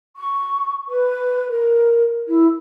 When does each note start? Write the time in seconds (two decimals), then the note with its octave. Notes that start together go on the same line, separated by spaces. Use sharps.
0.17 C#6
0.90 B4
1.50 A#4
2.28 E4